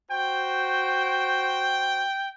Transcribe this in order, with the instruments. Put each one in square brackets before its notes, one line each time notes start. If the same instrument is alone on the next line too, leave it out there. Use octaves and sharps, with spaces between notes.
[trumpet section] F#4 C5 [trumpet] G5